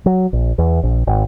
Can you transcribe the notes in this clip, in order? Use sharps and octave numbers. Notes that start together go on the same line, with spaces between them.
F#3
A#1
E2
A#1
G#1